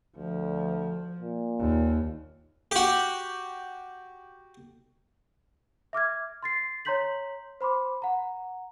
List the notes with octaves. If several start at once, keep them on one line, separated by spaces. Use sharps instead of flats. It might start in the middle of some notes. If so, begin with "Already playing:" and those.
D2 F3
A#2
D#2
F#4 G4
E5 D6 F6 G#6
C6 A6 C7
C#5 A#5 C6 G6 B6 F#7
C5 B5 C6 D6
F#5 A#5